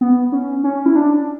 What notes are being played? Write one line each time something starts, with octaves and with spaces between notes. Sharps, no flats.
B3
C#4
C#4
E4
D4